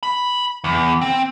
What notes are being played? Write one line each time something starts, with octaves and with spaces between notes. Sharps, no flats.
B5
E2
C4